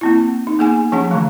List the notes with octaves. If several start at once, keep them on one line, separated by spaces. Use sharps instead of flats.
A#3 C4 E4
D#4
A#3 B3 G#4 F#5 G#5
F3 C#4 D4 G#4 F#5
D3 E3 A3